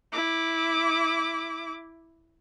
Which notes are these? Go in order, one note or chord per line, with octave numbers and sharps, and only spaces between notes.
E4 D6